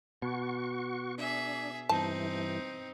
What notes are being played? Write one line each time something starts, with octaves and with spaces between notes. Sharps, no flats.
B2 F#4 C#6
D4 G#4 E5
G2 E3 C4 D#4 A5